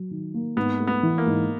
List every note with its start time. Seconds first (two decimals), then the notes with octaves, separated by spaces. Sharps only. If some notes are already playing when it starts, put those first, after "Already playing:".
Already playing: F#3
0.11 D#3
0.34 A#3
0.56 G#2 B3
0.80 A3
0.87 B3
1.03 E3
1.18 A#3
1.26 G#2